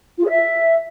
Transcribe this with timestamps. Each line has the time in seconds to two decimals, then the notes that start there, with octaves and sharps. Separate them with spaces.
0.17 F4
0.23 G#4
0.29 E5